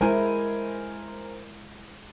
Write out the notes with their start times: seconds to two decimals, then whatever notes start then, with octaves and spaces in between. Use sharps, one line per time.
0.01 G#3 E4 A#4 C5 G#5